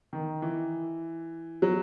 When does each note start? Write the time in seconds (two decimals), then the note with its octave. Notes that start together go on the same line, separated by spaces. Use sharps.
0.13 D#3
0.42 E3
1.62 F#3